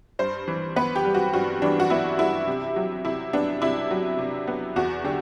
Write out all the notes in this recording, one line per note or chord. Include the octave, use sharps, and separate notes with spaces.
G2 C5
E3
B3 B4
G4
G3
F#4
G2 F#4
E3 D4
F#4
B3 E4
G3 E4
C3
F#3
C3 E4
B3 D4
C3 E4
F#3
C3
B3
E2 F#4
D3 G4